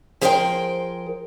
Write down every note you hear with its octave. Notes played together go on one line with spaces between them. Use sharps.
F3 G#4 A#4 C5 F#5 G5